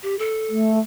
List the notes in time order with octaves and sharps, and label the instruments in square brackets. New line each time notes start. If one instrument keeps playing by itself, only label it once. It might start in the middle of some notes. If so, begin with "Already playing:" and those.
[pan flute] G4
A4
[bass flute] A3